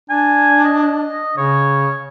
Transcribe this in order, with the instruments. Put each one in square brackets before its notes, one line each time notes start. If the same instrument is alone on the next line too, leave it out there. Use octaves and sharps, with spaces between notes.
[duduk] D4 [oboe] G#5
[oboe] D#5
[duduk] C#3 [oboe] C#5